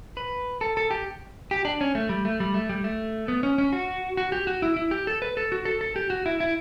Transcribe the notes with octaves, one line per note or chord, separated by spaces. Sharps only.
B4
A4
A4
G4
G4
D4
C#4
A3
G3
A3
G3
A3
G3
A3
B3
C#4
C#4
F#4
F#4
G4
F#4
E4
E4
G4
A4
B4
A4
F#4
A4
A4
G4
F#4
E4
E4